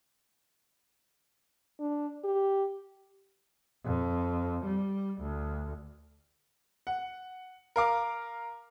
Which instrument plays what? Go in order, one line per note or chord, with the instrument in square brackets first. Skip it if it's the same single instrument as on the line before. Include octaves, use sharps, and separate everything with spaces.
[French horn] D4
G4
[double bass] F2
G3
D2
[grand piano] F#5
A#4 F5 D6